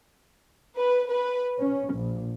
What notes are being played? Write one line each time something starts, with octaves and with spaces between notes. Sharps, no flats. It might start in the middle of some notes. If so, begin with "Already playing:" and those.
B4
B4
C#4
A#1